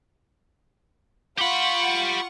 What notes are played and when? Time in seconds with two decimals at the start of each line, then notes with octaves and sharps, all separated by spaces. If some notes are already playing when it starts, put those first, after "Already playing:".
1.38 F4 G4 F#5 B5 C#6